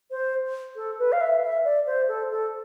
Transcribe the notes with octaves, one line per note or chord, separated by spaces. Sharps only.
C5
A4
B4
F5
E5
E5
D5
C5
A4
A4